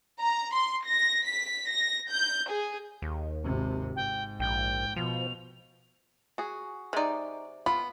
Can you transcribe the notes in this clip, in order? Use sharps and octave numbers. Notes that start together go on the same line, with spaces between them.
A#5
C6
A#6
B6
A#6
G6
G#4
D#2
G#1 C3
G#2 G5
A#1 G5
B2 F3 F7
F#4 G#4
C3 G#3 D#4 D5
B3 F4 B5